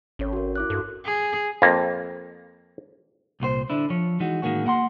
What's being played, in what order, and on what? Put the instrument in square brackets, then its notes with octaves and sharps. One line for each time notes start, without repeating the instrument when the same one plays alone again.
[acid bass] G#1 [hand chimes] C#4 A4 C#5
[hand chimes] F#4 A#4
E4 D6 F#6
[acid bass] G2 [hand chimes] F#4 A4
[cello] G#4
[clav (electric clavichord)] F2 A#3
[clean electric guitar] C2 A#2 F4 C5
D3 D4 E4
F3 C#5
E3 G#3 D#4 F#4
A2 D#3 G#3 A#3 C#4 F#4
A#3 F#5 B5 C6